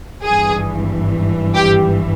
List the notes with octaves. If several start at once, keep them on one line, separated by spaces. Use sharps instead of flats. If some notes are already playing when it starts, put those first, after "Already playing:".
G#1 G2 E3 G#4
G4